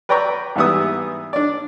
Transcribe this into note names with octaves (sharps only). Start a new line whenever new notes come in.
B4 D5 G5 A#5 B5 C#6
G#2 E3 G3 B3 E5 D#6
D4 D5